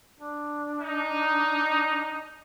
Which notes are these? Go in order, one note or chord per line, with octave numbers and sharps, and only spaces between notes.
D4
D#4